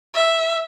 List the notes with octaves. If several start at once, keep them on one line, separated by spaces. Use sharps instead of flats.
E5